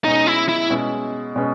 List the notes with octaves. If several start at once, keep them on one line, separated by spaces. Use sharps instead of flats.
B2 G#3 C#4 D#4
E4
E4
B2 G#3 C#4
B2 G#3 C#4